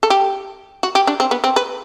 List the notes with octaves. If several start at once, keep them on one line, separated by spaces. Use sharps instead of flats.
A4
G4
F#4
G4
D4
C4
B3
C4
B4